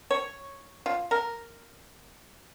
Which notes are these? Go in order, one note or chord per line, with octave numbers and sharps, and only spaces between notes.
C#5
F4
A#4